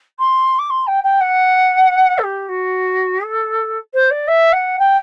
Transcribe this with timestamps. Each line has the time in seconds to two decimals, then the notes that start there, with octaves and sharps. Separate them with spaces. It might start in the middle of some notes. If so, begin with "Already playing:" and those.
0.19 C6
0.59 D6
0.70 C6
0.87 G5
1.04 G5
1.21 F#5
2.18 A4
2.23 G4
2.48 F#4
3.24 A4
3.94 C5
4.10 D5
4.28 E5
4.52 F#5
4.79 G5